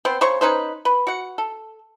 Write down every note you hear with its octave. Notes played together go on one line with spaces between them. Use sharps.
B3 C4 C5
C#3 C5 C#5 C#6
C#4 D#4 B4 C5
B4
F#4 F#5
A4